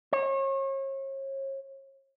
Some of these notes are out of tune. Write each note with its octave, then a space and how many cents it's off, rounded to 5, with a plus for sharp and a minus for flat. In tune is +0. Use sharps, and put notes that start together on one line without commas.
C#5 -35